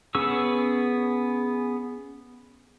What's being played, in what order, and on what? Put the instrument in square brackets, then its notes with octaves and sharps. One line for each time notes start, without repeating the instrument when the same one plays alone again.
[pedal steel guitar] B3 C#4 G#4 C#6 E6